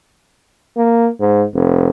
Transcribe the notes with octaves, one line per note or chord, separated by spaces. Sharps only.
A#3
G#2
F1